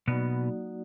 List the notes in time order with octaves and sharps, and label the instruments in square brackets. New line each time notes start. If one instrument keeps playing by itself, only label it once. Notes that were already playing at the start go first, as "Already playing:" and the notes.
[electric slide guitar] B2 B3 [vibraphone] F#3 A#3 D#4 F#4 D5